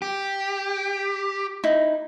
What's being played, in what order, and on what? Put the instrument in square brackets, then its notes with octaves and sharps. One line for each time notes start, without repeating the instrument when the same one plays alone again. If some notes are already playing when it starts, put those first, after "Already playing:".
[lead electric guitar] G4
[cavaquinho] D#4 E4